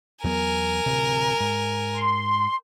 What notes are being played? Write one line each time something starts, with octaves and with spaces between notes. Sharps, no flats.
E2 F#3 B3 A#4 G#5
D1 C3
G#2
C6